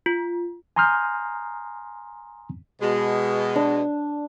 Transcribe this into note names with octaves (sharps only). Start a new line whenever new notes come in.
F4
G#5 A#5 C6 D#6 F6 G6
B2 G#3
D4